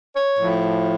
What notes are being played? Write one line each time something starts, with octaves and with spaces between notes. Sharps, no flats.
C#5
A2 F3